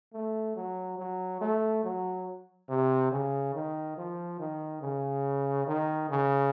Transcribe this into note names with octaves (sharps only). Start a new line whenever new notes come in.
A3
F#3
F#3
A3
F#3
C3
C#3
D#3
F3
D#3
C#3
D#3
C#3